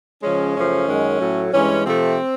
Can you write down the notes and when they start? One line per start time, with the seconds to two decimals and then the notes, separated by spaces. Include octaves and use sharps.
0.22 C#3 F3 G#3 C#4
0.56 F#2 C#3 F3 A3 C#4
0.87 F#2 D#3 G#3
1.20 A2 F#3 A3
1.52 G2 E3 G#3 C#4
1.85 C3 F3 A3 C4